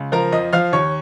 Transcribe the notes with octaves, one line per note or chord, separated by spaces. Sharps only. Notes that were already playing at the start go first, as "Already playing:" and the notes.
Already playing: C#2
F3 A#4 A#5
F2 D#5 D#6
F3 F5 F6
D#2 C#5 C#6